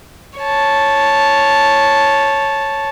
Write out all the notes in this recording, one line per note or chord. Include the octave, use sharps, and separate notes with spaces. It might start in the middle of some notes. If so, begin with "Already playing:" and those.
C#5 A5